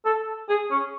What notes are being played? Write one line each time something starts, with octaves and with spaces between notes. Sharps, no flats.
A4
G#4
C#4